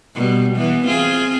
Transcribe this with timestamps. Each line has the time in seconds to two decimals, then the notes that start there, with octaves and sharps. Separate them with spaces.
0.15 B2 G3
0.56 E3 B3
0.86 C4 F4 G#4